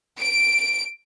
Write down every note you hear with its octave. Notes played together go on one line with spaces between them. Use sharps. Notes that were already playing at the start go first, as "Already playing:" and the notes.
D7